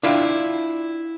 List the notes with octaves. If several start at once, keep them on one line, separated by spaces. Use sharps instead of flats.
D4 E4 F4 G5